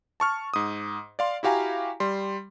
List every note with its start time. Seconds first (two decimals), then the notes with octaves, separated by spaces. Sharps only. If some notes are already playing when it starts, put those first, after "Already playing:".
0.20 A5 C#6 F6
0.54 G#2 D#6
1.19 D5 F5 C6
1.43 E4 F#4 G4 F5 G#5 A#5
2.00 G3 C6